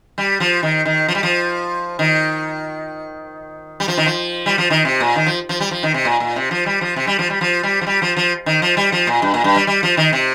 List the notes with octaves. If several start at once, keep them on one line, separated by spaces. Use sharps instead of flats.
G3
F3
D#3
D#3
F3
G3
F3
D#3
G3
F3
D#3
F3
G3
F3
D#3
C3
A#2
D#3
F3
F3
G3
F3
D#3
C3
A#2
A#2
C3
F3
G3
F3
C3
G3
F3
G3
F3
G3
F3
G3
F3
F3
D#3
F3
G3
F3
A#2
G2
A#2
G2
G3
G3
F3
D#3
C3